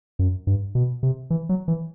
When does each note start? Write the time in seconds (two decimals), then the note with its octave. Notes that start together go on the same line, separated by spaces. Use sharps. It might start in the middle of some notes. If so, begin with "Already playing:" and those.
0.19 F#2
0.47 G2
0.75 B2
1.03 C3
1.30 E3
1.49 F#3
1.68 E3